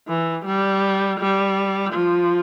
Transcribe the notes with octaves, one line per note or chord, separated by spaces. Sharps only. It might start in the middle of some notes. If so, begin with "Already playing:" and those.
E3
G3
G3
F3